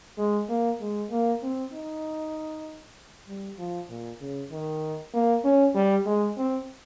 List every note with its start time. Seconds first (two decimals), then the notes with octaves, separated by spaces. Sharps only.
0.18 G#3
0.49 A#3
0.80 G#3
1.11 A#3
1.42 C4
1.73 D#4
3.28 G3
3.58 F3
3.89 A#2
4.21 C#3
4.51 D#3
5.14 A#3
5.44 C#4
5.75 G3
6.06 G#3
6.37 C4